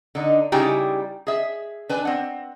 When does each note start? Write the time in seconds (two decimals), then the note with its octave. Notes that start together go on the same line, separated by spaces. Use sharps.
0.15 D3 D#4
0.52 C#3 G3 D#4 E4 G4 G#5
1.27 G#4 E5
1.89 D4 B4 G#5
2.05 C4 F#5